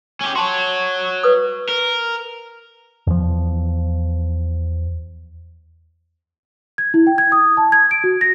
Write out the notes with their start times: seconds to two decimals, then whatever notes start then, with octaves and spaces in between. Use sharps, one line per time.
0.21 C#4 G4
0.36 F#4 C#5 A5 C6
1.23 B4 D#6
1.69 A#4
3.07 E2 F3
6.78 G#6
6.94 E4
7.07 G5
7.18 G#6
7.32 D#6
7.57 A5
7.72 G#6
7.91 D7
8.04 F#4
8.21 A#6